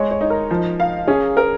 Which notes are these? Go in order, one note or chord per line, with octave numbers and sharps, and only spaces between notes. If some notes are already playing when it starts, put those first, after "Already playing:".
Already playing: G#3 C#5
C#5
D#4
A#4
F3
F5
C#4 G#4
A#4